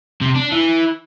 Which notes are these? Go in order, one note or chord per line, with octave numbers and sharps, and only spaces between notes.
C3
D4
E3